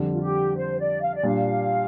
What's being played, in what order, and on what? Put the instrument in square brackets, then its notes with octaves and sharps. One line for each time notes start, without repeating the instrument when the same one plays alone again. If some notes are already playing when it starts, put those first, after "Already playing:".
Already playing: [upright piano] F2 D3 G3
[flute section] F4
G4
C5
D5
F5
D5
[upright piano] A#2 G3 D4 [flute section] F5